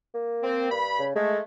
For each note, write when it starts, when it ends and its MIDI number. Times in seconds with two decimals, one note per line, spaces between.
0.14 0.80 58
0.42 0.69 60
0.70 1.03 43
0.70 1.03 83
0.99 1.13 49
1.16 1.40 56
1.16 1.40 57